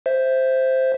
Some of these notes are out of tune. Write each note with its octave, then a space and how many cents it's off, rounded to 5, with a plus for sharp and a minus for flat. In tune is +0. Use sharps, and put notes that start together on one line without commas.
C5 +0 E5 +0